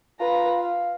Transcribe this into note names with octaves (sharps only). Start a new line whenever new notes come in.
F4 B4 A#5
F5